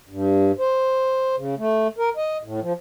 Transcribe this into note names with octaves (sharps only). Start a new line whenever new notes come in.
G2
C5
C#3
A3
A#4
D#5
A2
F3